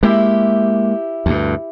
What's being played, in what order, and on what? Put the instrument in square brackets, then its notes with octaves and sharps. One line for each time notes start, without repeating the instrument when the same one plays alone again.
[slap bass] G#3 A#3 [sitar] E4 G4
[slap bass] D2 G2